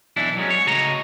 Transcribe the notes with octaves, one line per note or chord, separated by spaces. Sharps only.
B1 E3 D4 E4
F#3 G#3 C#4
C#5
A2 C#3 F#4 D#5 A#5